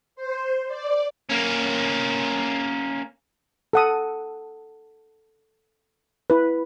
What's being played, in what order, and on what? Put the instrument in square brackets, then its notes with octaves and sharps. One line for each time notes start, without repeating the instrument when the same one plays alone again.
[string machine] C5
D5
[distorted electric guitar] A#3 C#4
[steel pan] A4 F#5 D#6
E4 B4